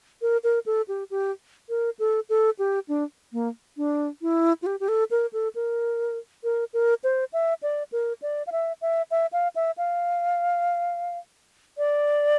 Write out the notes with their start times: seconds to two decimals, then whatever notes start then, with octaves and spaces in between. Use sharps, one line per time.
0.22 A#4
0.44 A#4
0.66 A4
0.88 G4
1.10 G4
1.69 A#4
1.99 A4
2.29 A4
2.59 G4
2.88 D4
3.33 A#3
3.77 D4
4.22 E4
4.62 F4
4.66 G4
4.80 G4
4.88 A4
5.11 A#4
5.33 A4
5.55 A#4
6.44 A#4
6.74 A#4
7.04 C5
7.33 E5
7.63 D5
7.92 A#4
8.22 D5
8.47 F5
8.52 E5
8.82 E5
9.11 E5
9.33 F5
9.56 E5
9.78 F5
11.78 D5